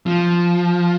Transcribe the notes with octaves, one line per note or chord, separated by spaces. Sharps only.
F3